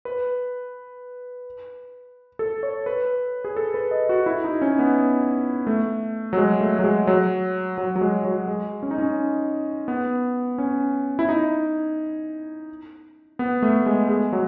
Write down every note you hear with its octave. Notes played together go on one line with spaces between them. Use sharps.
B4
A4
C#5
B4
G#4
A4
B4
D#5
F#4
E4
D#4
C#4
B3
A3
F#3
G#3
A3
F#3
G#3
F#3
F#3
F#3
G#3
F#3
G#3
C#4
D#4
C#4
B3
C#4
E4
D#4
B3
A3
G#3
G#3
F#3